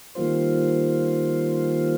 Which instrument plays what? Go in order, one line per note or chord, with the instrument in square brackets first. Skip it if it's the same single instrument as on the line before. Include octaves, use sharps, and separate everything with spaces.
[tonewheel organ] D#3 G3 A#3 F4 C5